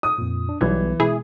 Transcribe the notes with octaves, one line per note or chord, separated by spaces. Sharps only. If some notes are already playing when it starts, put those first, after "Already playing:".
D#6
F2 A#2
D4
B1 E3 G3 G#6
B2 G#3 E4 G#4